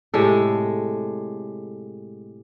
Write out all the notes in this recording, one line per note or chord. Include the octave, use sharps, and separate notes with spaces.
A2 C3 G#3 A4